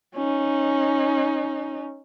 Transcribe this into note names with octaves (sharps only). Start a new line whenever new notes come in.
C#4 D#4